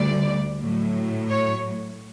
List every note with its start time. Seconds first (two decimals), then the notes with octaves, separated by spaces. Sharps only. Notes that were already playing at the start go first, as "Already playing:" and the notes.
Already playing: D2 D3 G3 D5
0.62 A2 F#3
1.30 C#5